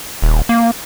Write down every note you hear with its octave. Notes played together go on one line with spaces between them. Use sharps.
D#1
A#3